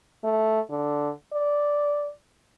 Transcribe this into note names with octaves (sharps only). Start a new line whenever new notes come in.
A3
D3
D5